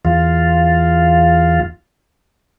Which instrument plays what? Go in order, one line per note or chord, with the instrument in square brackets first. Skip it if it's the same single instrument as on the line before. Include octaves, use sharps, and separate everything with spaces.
[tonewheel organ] E2 F4